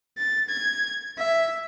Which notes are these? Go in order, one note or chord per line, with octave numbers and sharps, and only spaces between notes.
A6
G#6
E5